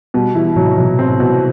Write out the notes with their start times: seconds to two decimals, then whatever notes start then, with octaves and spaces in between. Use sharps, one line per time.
0.14 B2 G3 B3
0.35 E3 G3 E4
0.56 A2 C3 F#3
0.78 B2 F#3
0.99 C4
1.09 A2 C3
1.20 B2